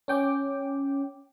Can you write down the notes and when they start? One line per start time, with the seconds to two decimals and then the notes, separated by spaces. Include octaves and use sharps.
0.08 C#4 G5 D6